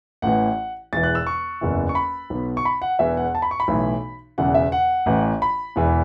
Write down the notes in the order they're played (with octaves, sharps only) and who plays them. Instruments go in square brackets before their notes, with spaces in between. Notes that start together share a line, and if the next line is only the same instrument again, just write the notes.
[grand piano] A1 A2 E3 F#5
E1 E2 E3 A6
F#6
E6
C#6
F#1 E2 E3
C#6
B5
B1 B2
C#6
B5
F#5
E1 E2 E3 E5
F#5
A5
B5
C#6
B5
B1 A2 E3
E1 E2 C#3 E3 F#5
E5
F#5
A1 A2 E3
B5
E1 E2 E3